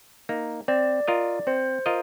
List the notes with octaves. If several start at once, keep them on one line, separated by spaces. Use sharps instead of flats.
A#3 D#4
C4 D5
F4 A#4 D#5
C4 C5
F4 A#4 D#5